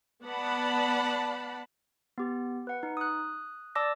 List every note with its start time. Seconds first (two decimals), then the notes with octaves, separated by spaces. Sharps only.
0.24 B3 D5 F#5 A5 B5
2.18 B3 G4
2.67 B4 F#5
2.83 D#4
2.97 D#6 F#6
3.75 D5 A5 D6 E6 A#6